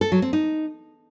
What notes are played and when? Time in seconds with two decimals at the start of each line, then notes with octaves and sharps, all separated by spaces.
0.01 A4
0.12 F#3
0.22 C4
0.33 D#4